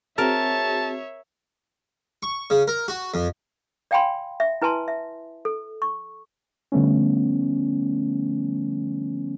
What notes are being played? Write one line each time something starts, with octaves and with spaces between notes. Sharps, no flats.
C4 F#4 G#4 A#4 C#5 E5 A5
C#6
C#3
A#4
F#4
F2
D5 F5 G5 G#5 B5 C6
E5
E4 B4 G#5 A5 C6
E5
A4
C#6
D3 F3 G3 A3 B3 C#4